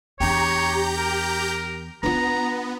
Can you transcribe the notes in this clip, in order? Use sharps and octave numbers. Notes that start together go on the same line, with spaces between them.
E2 D4 G4 C#5 A#5 G6
A#4
B3 D4 F4 A#5